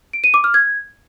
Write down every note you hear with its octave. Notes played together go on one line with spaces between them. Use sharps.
D7
D#7
D6
F6
G#6